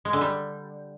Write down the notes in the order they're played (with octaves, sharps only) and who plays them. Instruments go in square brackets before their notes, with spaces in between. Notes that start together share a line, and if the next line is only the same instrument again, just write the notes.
[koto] G#3
D3
G3